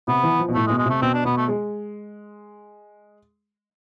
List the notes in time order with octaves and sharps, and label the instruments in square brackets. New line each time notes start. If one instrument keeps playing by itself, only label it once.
[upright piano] C3 [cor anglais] B3
[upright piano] E3
F3
B2
[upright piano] A2 [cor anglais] A3
[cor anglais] G#3
[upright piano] B2
[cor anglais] G#3
[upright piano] C3 [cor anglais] A3
[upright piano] B2 [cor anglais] C4
[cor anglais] D4
[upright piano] B2 [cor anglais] B3
[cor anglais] A3
[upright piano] G#3